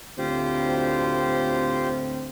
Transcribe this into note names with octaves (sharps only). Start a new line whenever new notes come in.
D2 A2 C4 F4 G4 C5